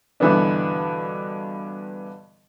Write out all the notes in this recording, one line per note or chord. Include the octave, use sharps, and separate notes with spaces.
G2 B2 D3 E3 B3 D4